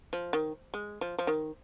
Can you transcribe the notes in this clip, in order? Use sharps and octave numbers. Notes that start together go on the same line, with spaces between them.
F3
D#3
G#3
F3
F3
D#3